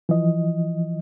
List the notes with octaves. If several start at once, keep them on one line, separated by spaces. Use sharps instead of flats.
E3 F3 D#5